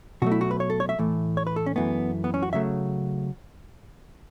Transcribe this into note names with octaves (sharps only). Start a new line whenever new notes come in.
B2 F#3 A3 F#4
E4
F#4
B4
C#5
A4
C#5
E5
A2 E3 A3
C#5
B4
A4
C#4
F#2 E3 A3 B3
B3
C#4
F#4
C#3 F#3 A3 E5